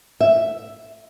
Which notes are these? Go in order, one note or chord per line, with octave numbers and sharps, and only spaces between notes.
E5